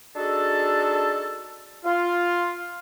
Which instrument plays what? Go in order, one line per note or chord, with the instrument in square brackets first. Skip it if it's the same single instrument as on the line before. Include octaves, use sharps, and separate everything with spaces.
[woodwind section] D4 D#4 F#4 G#4 A4
F4